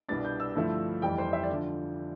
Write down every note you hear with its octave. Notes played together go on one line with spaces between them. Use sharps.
C2 B2 G3 B3 D4 A6
G6
E6
G2 D3 F3 A3 E4
F1 F2 E3 G3 G5
C5
E5
D5
D3 F3